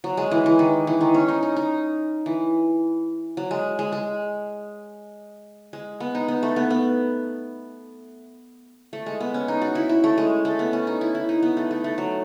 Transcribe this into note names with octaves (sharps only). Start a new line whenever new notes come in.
F#3
G#3
E3
E3
D#3
E3
D#3
C#4
D#4
D#4
D#4
E3
F#3
G#3
G#3
G#3
G#3
B3
D#4
B3
A3
B3
B3
A3
G#3
B3
C#4
D#4
F#4
E4
E4
A3
G#3
A3
B3
C#4
D#4
E4
E4
D#4
B3
A3
A3
A3
F#3